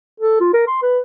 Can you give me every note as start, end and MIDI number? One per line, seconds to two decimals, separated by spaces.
0.20 0.37 69
0.40 0.51 65
0.53 0.67 70
0.67 0.81 84
0.82 0.99 71